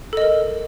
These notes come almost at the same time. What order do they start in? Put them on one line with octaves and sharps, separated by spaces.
A4 D#5 A#4